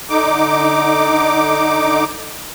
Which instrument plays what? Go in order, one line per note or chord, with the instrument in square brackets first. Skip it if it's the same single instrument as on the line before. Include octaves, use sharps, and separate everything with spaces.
[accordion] D3 D#4 D6